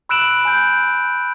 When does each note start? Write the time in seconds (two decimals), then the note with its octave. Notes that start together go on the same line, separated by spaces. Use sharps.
0.09 B5 E6 F#6 D7 E7 F#7
0.45 G#5 G6